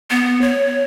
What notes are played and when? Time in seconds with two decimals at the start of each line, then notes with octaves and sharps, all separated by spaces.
0.11 B3
0.41 C#5